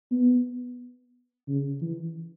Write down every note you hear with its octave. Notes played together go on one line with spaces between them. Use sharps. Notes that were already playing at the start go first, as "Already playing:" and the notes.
B3
C#3
E3